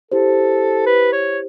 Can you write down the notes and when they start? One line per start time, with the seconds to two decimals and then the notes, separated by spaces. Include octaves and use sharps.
0.11 E4 G4 A4 C5
0.87 B4
1.13 C#5